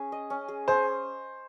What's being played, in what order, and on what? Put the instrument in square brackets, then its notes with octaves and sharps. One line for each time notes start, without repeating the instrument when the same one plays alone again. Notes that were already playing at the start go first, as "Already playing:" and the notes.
Already playing: [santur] C#4 G#4
D#5
C#4
G#4
[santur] G#4 [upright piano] C5